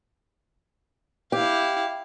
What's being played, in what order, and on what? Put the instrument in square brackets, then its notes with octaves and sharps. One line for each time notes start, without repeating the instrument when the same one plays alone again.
[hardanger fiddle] E4 F5 [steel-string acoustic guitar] G4